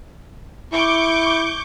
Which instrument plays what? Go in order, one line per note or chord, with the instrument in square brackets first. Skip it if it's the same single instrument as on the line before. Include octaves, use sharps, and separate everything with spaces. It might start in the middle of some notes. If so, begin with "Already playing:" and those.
[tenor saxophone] E4 [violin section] C#6 D6 G6